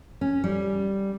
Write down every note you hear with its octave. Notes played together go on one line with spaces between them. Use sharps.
C#4
G3